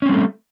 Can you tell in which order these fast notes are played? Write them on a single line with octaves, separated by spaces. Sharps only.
C#4 C4 G3 A3